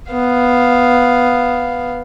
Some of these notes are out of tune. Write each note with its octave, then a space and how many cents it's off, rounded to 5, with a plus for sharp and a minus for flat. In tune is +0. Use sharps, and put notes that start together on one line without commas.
B3 +0 F5 +0